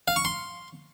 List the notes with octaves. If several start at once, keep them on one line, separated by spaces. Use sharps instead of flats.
F5
C#6
C6